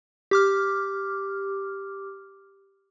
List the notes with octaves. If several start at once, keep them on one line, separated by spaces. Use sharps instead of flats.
G4 D6 F6